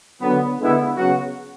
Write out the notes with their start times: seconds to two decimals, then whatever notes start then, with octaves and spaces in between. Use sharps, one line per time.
0.21 D3 F#3 B3
0.59 D3 G#3 B3 E4
0.96 C#3 F#3 B3 F#4